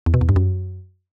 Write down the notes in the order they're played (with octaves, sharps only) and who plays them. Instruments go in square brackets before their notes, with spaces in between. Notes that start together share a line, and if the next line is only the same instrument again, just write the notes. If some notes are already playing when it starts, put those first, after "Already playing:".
[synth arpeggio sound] E2
B2
E2
G2
F#2